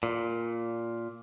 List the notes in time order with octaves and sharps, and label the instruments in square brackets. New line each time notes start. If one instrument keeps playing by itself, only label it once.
[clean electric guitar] A#2